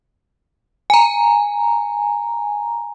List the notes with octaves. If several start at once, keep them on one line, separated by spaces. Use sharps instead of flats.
G#5 A#5